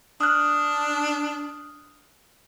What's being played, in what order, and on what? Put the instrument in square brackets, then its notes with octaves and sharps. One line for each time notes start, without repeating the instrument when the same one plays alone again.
[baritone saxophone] D4 [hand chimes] D#6 F6 F#6